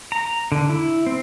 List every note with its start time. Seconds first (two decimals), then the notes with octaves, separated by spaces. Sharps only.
0.12 A#5
0.52 D3
0.70 E4
1.07 C4